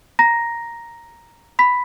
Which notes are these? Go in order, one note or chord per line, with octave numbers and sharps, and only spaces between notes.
A#5 A#6
B5 B6